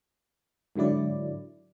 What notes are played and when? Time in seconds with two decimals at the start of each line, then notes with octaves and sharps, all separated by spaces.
0.76 G#2 D3 F#3 E4 D5